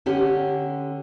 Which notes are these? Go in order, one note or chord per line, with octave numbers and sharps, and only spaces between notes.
D3 C#4 G4